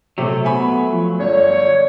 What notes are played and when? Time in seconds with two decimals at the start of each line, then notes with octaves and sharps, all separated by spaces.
0.18 C3 F#3 A3
0.44 B3 E5 G#5 B5
0.90 F3
1.19 G1 C#5 D5